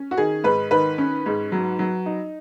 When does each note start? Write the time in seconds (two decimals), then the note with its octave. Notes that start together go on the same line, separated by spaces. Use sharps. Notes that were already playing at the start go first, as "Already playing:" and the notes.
Already playing: C#4
0.11 F#4
0.17 D#3 G#4
0.44 G#2 B4
0.71 D#3 B4
0.98 C#4
1.26 G#2
1.52 F#3
1.79 F#3
2.06 D#4